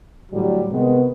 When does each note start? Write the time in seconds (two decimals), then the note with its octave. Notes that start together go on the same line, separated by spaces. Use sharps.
0.32 A2 D3 F#3 G3
0.72 C3 D#3 G#3 B3